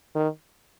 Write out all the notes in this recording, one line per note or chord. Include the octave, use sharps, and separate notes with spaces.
D#3